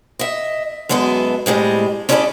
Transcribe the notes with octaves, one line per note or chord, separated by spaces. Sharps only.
D#5 E5
F#2 G#3 B3 F#4 A4
A2 G3 G#3 C4
C#4 D4 E4 G#4 A4 D5